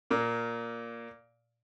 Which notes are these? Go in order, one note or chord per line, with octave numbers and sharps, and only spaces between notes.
A#2 A#3